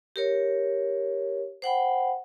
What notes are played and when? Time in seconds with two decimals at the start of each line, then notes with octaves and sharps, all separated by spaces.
0.16 G4 A#4 C#5
1.62 C5 F#5 G5 B5